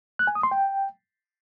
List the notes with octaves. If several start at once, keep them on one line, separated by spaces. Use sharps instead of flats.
F#6
G#5
D#6
C6
G5